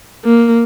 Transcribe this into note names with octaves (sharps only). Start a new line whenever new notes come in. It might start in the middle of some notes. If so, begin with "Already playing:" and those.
A#3